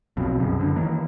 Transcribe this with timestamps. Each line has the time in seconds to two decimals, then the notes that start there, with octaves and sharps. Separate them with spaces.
0.17 B1 F2 B2
0.40 C2 F#2 C#3
0.59 F#2 D3
0.76 D#3 E3 A#3